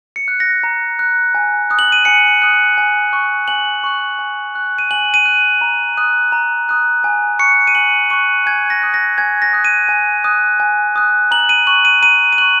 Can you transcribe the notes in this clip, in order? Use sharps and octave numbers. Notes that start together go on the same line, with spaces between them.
C#7
F#6
A#6
A#5
F#6
G#5
D#6 F#6
F#7
D#7
G#5 C#7
D#6 F#6
G#5
C#6 F#6
G#5 F#7
C#6 F#6
G#5
F#6
D#7
G#5 F#7
D#7
F#6
A#5
D#6 F#6
A#5
D#6 F#6
G#5
C#6 F#6 C#7
D#7
G#5 F#7
C#6 F#6 D#7
G#5 G#6
A#6
D#6 F#6
A#6
G#5 G#6
A#6
D#6 F#6
D#7
G#5
D#6 F#6
G#5
D#6 F#6
A#5 F#7
D#7
C#6 F#6 F#7
D#7
A#5 D#7
D#7
C#6 F#6 F#7